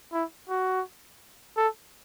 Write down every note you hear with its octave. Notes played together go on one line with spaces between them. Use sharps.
E4
F#4
A4